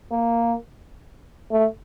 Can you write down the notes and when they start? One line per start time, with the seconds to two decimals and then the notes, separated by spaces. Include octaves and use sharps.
0.12 A#3
1.51 A3